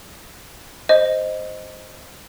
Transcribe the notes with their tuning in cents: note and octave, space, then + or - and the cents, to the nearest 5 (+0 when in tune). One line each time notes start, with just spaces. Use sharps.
C5 +0 D#5 +0